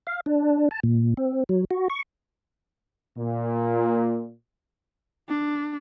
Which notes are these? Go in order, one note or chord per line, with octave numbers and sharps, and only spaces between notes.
F5
D4
A5
A#2
C4
F#3
F#4
C#6
A#2
D4